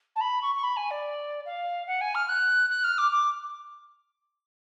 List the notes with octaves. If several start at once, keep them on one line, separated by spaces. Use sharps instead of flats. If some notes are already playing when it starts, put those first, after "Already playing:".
A5
B5
C#6
C#6
B5
G#5
D5
F5
F#5
G#5
F6
F#6
F#6
F6
D6
D6